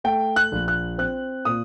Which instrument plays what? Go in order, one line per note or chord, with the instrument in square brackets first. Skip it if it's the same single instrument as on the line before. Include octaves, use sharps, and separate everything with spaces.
[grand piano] A3 G5
F#6
A#1
F#6
C4 F#6
A#2 D#6